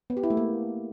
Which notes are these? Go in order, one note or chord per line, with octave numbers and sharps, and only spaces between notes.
B3
G4
E4
A3
A#3